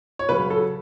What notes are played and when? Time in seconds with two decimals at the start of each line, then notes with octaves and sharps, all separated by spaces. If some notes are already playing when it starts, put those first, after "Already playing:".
0.19 C#5
0.29 C#3 F#3 B4
0.50 A4